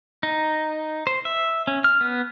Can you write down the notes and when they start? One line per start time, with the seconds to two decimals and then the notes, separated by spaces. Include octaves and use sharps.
0.23 D#4
1.07 C5
1.25 E5
1.67 C#4
1.84 F6
2.01 B3